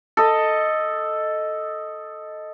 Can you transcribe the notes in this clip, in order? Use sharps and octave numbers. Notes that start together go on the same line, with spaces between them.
A4 D#5